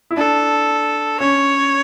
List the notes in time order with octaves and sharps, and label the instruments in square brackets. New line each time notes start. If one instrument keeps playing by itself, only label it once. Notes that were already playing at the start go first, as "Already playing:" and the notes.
[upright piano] E4
[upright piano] D4 [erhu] A4
[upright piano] C#4 [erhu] C#5